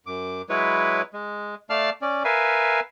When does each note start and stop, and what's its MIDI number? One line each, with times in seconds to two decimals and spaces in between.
0.06 0.42 42
0.06 0.42 86
0.49 1.02 54
0.49 1.02 56
0.49 1.02 64
0.49 1.02 71
0.49 1.02 73
1.13 1.55 56
1.70 1.90 57
1.70 1.90 74
1.70 1.90 77
1.70 1.90 81
1.70 1.90 89
2.02 2.23 61
2.02 2.23 74
2.24 2.80 70
2.24 2.80 71
2.24 2.80 76
2.24 2.80 77
2.24 2.80 80